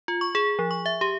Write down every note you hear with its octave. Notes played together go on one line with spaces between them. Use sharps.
F4
C#6
G#4
F3
C#6
E5
G4